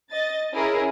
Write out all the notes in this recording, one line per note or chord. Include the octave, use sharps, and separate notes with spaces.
D#5 A6
C#4 E4 G#4 A#4